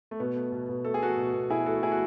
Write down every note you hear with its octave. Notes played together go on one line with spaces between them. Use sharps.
A3
B2 B3
A3
B2
B2
A3 A4
G#4
A3 F#4 A4
B2
B2
B2 E4 G#4
A3 F#4 A4
A3 E4 G#4
F#4